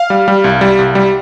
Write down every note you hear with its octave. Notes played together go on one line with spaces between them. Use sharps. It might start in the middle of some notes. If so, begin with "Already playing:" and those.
Already playing: F5
G3
G3
C2
G3
C2
G3